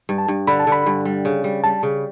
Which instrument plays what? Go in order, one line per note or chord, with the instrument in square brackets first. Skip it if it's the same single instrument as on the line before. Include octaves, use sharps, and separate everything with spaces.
[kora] G2
[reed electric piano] A5
[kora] G2
[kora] D3 [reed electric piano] B5
[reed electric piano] A5
[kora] D3
[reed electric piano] B5
[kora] G2
G3
C#3
G3
[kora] G3 [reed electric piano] A5
[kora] C#3